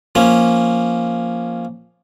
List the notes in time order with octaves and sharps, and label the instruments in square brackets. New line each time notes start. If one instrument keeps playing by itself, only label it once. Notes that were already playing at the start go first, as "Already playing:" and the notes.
[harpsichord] F3 A#3 C#4